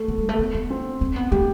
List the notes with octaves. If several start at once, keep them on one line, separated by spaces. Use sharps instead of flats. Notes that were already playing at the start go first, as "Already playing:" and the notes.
Already playing: A3
B3
G3
A3
B3
B3
C4
C4
B3
A3 G4